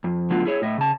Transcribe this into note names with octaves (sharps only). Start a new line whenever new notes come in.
F2
D3 F#3 A3 B3 F4 F#4
E4 G#4 C#5
A2 D#5 E5
C#3 A5